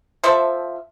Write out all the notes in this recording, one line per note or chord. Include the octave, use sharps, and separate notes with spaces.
F3 A4 C5 E5